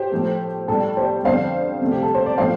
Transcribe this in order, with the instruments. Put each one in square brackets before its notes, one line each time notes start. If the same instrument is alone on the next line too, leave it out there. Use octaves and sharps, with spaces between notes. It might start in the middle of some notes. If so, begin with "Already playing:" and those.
Already playing: [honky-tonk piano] G4 C5
A2 F3 A3
A2 G3 A4
G4 C5
F2 D3 G3 C5 F5
F2 C3 A3
G4
A4
C5
D5
A2 F3 A3 C5 F5